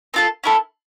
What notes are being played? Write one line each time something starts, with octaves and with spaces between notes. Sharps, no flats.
C4 F4 A4
C#4 E4 A4